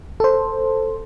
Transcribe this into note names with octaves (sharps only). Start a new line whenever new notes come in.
A4 C5